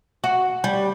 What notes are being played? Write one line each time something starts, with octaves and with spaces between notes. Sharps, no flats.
F#4
G3